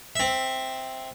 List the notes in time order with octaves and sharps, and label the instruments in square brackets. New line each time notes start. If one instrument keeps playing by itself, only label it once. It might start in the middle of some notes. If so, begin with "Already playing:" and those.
[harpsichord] C4 E5